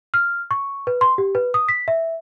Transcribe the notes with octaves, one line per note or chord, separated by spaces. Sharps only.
F6
C#6
B4
C6
G4
B4
D#6
B6
E5